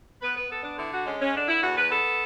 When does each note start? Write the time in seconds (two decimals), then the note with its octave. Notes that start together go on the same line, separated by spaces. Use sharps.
0.22 B3 B4
0.35 B4
0.49 B3 A4
0.63 D4
0.77 D3 E4
0.92 F#4
1.05 G#3 C#4
1.20 C#4
1.33 D3 D4
1.48 E4
1.61 E2 F#4
1.76 B4
1.89 B3 A4